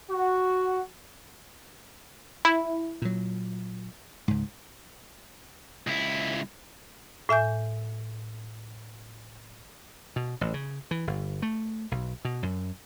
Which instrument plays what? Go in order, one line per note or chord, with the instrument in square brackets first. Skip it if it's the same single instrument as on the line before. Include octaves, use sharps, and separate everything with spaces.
[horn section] F#4
[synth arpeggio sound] E4
[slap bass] A#2 F#3
C#2 G#2
[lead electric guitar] C#2 E4
[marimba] A2 E5 G#5 G6
[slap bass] B2
A1
C#3
E3
G1
A3
B1
B2
F#2